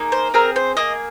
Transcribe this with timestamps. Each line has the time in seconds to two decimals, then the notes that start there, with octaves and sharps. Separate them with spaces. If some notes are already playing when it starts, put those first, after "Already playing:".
Already playing: A#3 D#4 G#4
0.12 C5
0.34 C4 G#4 A#4
0.56 C5
0.77 A#3 G#4 D#5